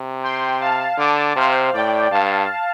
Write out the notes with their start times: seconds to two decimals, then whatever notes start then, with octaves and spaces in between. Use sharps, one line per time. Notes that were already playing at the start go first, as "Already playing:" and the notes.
Already playing: C3
0.23 G5 C6
0.60 F5 A5
0.98 D3 A5 D6
1.36 C3 C5 F5
1.73 A2 D5 G5
2.11 G2 F5 A5